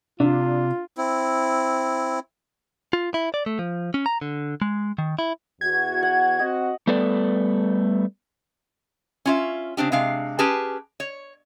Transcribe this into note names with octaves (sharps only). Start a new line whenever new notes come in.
C3 D4 F4
C4 E4
F4
E4
D5
A3
F3
C#4
A#5
D3
G#3
D#3
E4
E2 F#4 G#6
F#5
C4 F#4 D#5
G3 A3 B3 A4 B4 D5
C#4 F4 E5
C#3 C4 D4 G4
C3 G#3 D4 F5
C#4 G4 G#4 B4 A5
C#5